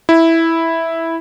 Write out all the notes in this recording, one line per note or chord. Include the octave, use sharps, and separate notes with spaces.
E4